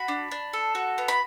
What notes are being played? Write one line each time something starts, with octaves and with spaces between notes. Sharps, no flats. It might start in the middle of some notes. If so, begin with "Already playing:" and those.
Already playing: F#4 B5
D4
D4
A4
F#4
B3
B5